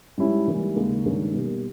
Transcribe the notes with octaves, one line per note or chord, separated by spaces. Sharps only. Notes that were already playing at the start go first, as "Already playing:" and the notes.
G#2 G3 C#4 E4
G#2 E3 G3 A#3
D#2 C#3 G#3
G2 D#3 G#3 C#4
B2 G3 A#3